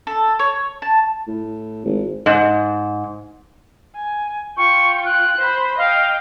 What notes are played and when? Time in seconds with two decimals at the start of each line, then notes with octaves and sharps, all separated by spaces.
0.07 A4
0.39 C#5
0.82 A5
1.28 A2
1.85 G#1
2.26 G#2
3.95 G#5
4.57 F4 G5 C#6
5.05 F#6
5.37 C5 B5
5.78 D#5 F5 G5